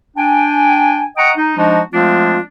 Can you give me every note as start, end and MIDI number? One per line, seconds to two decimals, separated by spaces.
0.17 1.05 62
0.17 1.05 79
0.17 1.05 80
1.17 1.32 75
1.17 1.32 78
1.17 1.32 79
1.17 1.32 82
1.17 1.32 85
1.17 1.32 87
1.37 1.53 63
1.57 1.80 53
1.57 1.80 56
1.57 1.80 62
1.57 1.80 63
1.57 1.80 66
1.57 1.80 75
1.92 2.39 53
1.92 2.39 56
1.92 2.39 57
1.92 2.39 60
1.92 2.39 62
1.92 2.39 65